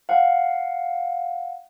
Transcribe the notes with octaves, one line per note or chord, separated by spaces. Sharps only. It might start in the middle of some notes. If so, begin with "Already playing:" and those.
F5 F#5